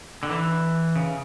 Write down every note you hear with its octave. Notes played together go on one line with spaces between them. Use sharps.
D3
E3
C#3